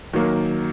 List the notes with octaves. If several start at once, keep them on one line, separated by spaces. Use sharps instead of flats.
D#3 F#3 A#3